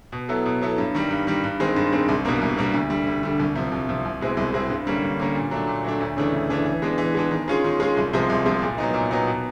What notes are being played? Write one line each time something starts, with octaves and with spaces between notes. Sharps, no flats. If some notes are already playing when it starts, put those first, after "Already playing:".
B2
F#3 B3 E4 A4
B2
F#3 B3 E4 A4
G2
D#3 G3
G2
D#3 G3
G2
D#3 G#3 C4
G2
D#3 G#3 C4
C2
B2 G3 A#3 D4
C2
B2 G3 A#3 D4
D2
D3 G3
D2
D3 G3
C2
C3 F3
C2
C3 F3
C2
B2 G#3 C4 E4
C2
B2 G#3 C4 E4
G2
D3 G3 A#3 C#4
G2
D3 G3 A#3 C#4
A#2
F#3 A3 D4
A#2
F#3 A3 D4
D2
C#3 E3 A3 D4
D2
C#3 E3 A3 D4
E3
G#3 B3 D4
E3
G#3 B3 D4
D#3
G#3 C#4 F4 G#4
D#3
G#3 C#4 F4 G#4
C2
C3 F3 G#3
C2
C3 F3 G#3
A#2
F#3 B3 D#4
A#2
F#3 B3 D#4
B2